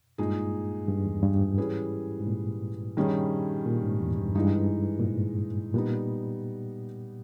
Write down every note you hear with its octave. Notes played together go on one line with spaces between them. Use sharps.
G2 A#2 G#3 D#4 G#4
G2
E2
G2
G#2
E3 G3 C#4 G#4 B4
G#2
A#2
G2 D#3 G3 C#4 G#4
A#2
G#2
E2
G2
G2 E3 G#3 D#4
A#2
G#2
A#2 G3 B3 D#4